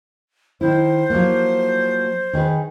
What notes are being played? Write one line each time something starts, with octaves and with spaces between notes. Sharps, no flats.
D#3 E4 C5
F3 F#3 A#3
D#3 G#4 B4